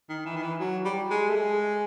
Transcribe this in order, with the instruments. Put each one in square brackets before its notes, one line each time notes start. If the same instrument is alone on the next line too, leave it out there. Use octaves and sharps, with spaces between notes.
[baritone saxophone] D#3
E3
D#3
E3
F#3
G3
G#3
A3
G#3